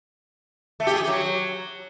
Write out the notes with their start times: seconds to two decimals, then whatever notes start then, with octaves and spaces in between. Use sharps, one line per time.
0.80 A3
0.87 G4
0.94 G#4
1.01 G4
1.08 F#3